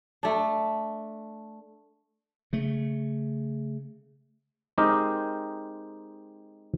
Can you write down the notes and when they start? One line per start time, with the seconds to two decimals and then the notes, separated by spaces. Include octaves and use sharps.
0.23 A3 D4
2.53 C#3 A3
4.78 G#3 C4 D#4 G4 A#4 D#5